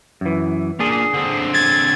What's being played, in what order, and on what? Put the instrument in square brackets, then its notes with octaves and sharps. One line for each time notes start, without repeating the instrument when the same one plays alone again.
[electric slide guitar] F#2 E3
[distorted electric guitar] A#2 [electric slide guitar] D4 G#4
[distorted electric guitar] D3 C4
[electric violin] G#6 [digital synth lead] A6